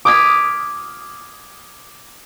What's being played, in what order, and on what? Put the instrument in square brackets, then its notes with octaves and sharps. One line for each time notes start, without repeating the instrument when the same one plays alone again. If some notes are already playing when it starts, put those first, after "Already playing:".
[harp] D6 D#6 F6 G#6 B6 D#7